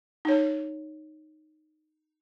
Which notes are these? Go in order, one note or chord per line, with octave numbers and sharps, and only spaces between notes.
D#4 C#5